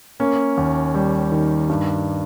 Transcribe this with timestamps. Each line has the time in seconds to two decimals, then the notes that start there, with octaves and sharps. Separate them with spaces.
0.20 A#3 C#4
0.57 D#2
0.94 G3
1.32 D#3
1.69 G2